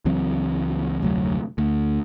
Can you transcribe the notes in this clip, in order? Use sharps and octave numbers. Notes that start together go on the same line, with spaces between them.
C#2 E3 F#3 C4
F1 D2 F#3
D2